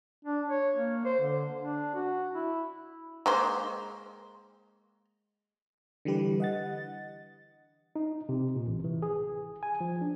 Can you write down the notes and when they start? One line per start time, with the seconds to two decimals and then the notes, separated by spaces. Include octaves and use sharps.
0.25 D4
0.49 C#5
0.75 A#3
1.05 C5
1.21 D3
1.60 D4
1.94 F#4
2.35 E4
3.26 G#3 A#3 C5
6.05 D3 E3 G3 G4 B4
6.40 D#5 F#5 A6
7.96 D#4
8.29 C3
8.56 A#2
8.67 A1
8.84 E3
9.02 G#4
9.63 G#5
9.81 F3
10.01 D4